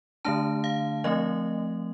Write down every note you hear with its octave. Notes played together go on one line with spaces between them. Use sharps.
D3 A3 D4 A5
F5
F3 A3 C4 D#5